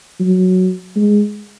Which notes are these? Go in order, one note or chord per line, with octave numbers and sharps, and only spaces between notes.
F#3
G#3